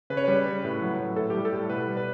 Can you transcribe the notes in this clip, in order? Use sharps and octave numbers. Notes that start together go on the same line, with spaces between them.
C#3 B4
C#5
G3 B4
C#3
A2
F#3
A2
A2 A4
G3 G4
A4
A2
B2 B4
G3
B4